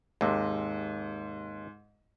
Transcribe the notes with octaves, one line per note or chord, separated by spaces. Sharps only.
D#2 G#2 C3